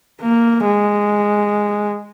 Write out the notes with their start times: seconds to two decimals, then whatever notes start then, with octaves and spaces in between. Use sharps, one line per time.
0.22 A#3
0.65 G#3